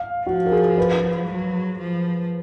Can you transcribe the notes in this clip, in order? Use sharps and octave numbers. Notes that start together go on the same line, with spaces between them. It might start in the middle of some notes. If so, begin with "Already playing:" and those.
Already playing: F5
F3 F#4
A#4
G#4
B4
F#3
F3